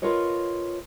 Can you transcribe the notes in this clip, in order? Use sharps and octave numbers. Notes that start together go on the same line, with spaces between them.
F4 A#4 B4 C#5 D#5